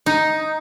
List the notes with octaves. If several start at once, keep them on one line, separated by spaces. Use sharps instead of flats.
D#4